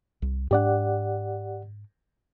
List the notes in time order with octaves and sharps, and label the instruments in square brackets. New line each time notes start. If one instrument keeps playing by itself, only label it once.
[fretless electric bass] C2
[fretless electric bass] G#2 C4 D4 [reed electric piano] G4 D5 F#5